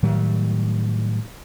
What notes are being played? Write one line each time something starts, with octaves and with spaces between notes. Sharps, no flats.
A2 D#3 F#3 G3